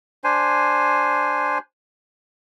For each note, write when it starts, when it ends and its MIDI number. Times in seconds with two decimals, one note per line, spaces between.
0.24 1.58 62
0.24 1.58 72
0.24 1.58 80